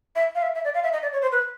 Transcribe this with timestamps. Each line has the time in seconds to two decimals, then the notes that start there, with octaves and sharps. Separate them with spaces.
0.16 E5
0.35 F5
0.42 E5
0.55 E5
0.64 D5
0.75 F5
0.83 E5
0.93 D#5
1.02 D5
1.13 C#5
1.22 C5
1.32 B4